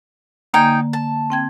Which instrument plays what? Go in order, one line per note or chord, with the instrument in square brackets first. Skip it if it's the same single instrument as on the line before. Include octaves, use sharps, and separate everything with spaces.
[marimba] D3 A#3 [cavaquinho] D#4 G5 G#5
[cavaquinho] A5
[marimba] C4 G5 G#6